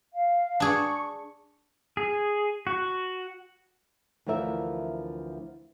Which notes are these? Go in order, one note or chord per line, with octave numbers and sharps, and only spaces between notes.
F5
D4 G#4 C#6
G#4
F#4
D2 E3 F3 A#4 E5